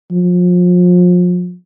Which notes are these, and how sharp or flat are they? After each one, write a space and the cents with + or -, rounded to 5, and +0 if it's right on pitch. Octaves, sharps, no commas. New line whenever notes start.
F3 +35